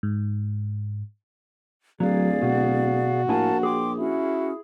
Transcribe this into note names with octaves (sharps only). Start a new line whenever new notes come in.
G#2
D1 F#3 G#4 D5 F5
B2 F#4
A#1 A2 E4 A#4 F5 G#5 A5
G#4 G5 C6 D6
C#4 E4 F#4